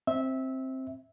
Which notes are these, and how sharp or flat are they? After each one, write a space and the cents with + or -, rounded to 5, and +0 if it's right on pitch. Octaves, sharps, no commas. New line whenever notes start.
C4 +10 E5 -15